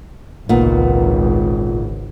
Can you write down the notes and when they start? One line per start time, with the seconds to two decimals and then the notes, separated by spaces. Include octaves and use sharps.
0.49 G#1 C#2 A#2 B3 D#4